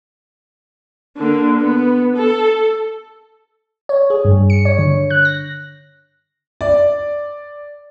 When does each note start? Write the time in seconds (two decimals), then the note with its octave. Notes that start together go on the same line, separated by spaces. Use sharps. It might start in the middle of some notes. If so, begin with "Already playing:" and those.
1.17 D3 A#3
1.61 B3
2.16 A4
3.89 C#5
4.10 G#4
4.25 G2
4.50 C#7
4.65 C#5
4.79 D3
5.10 F#6
5.25 A#6
6.61 D5